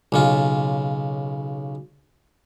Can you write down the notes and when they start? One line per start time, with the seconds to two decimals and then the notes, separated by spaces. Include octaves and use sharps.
0.12 B1 C#3 F4